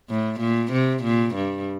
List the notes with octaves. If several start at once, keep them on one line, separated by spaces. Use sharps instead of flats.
A2
A#2
C3
A#2
G2